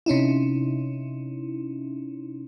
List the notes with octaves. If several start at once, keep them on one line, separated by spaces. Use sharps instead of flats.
C3 C#4 D#4 E4